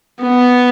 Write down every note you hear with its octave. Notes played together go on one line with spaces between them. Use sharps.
B3